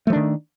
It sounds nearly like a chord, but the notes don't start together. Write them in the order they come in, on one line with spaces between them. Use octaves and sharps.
A3 F3 D4 D#3